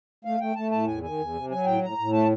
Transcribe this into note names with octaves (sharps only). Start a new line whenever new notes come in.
A3 F5
A3 G5
A3 A5
A2 A5
E2 G#5
D#3 G#5
E2
C3
F#3 G#5
A2 G5
A2 A#5
A2
A3 A5